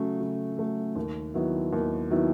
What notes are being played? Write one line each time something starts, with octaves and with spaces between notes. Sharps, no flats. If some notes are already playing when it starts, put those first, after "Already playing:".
Already playing: C#3 F#3 A3
C#3
F#3 A3
D#2
D#3 F#3 B3 E4
D#2
D#3 F#3 B3 E4